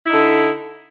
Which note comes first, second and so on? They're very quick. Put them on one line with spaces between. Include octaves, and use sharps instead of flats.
E4 D#4 D3